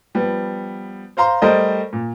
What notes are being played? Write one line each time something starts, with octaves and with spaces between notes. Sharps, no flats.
F3 G3 B3
C5 F5 A#5 C6
G3 A3 A#4 C5 D5 D#5
A#2